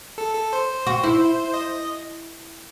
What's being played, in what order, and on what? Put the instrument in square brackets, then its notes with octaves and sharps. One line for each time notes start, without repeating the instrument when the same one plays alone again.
[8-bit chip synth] A4
A4
C5
[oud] F#4
E4
[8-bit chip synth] D#5